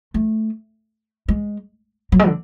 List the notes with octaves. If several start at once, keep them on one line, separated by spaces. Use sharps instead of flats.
A3
G#3
F#3
G#3
D3